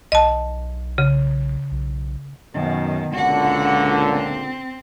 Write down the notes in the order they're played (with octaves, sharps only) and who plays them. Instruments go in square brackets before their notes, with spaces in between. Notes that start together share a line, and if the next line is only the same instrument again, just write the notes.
[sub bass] B1 [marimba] D#5 A5
[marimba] C#3
[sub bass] B1
[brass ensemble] F#2 [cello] B2 D#3
[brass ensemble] C#2 A#2 D3 [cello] F#4 F#5
[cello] C4